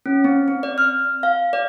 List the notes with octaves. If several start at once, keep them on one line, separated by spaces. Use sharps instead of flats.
C#4
C4
C4
D5
F6
F5
D5